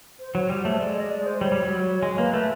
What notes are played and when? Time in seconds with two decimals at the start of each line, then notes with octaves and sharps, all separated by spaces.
0.19 C5
0.34 F#3 C#5
0.49 G3 C5
0.65 A3 C#5
0.80 G#3 D5
0.96 D#5
1.10 D5
1.26 C5
1.41 G3 C#5
1.52 G3
1.62 F#3
2.03 G#3
2.18 A#3 B4
2.33 A3 B4